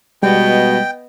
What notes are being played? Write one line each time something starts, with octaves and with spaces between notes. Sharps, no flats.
B2 G3 G#3 B3 D#5 G5